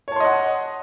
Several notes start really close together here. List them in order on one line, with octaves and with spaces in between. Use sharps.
C#5 A5 C6 D#5 F#5